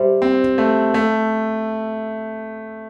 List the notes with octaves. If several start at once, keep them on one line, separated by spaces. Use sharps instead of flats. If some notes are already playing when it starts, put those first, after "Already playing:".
Already playing: G3 C5 E5
C4
A3
A3